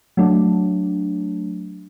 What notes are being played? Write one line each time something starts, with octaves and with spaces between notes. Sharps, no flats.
F#3 A3 D4